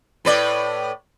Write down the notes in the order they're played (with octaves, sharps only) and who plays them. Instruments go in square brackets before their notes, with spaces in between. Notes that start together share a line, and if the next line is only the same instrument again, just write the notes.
[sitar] A2 B4 D5